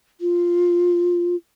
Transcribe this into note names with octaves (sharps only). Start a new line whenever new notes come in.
F4